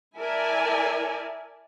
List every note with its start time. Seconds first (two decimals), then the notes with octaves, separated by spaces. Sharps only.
0.18 E4 A#4 D5 E5 G#5 A5